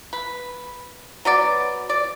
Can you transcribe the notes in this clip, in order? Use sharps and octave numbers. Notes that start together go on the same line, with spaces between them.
B4
F#3 B3 D5
D5